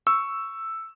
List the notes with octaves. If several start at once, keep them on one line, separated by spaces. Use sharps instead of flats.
C#6 E6